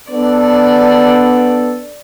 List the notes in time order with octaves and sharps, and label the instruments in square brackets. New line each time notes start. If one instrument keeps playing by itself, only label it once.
[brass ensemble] B3 D4 A4 [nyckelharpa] D5